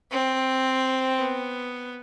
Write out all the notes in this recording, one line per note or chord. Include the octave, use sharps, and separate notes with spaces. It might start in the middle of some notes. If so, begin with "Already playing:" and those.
C4
B3